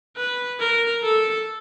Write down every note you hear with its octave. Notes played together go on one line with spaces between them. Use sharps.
B4
A#4
A4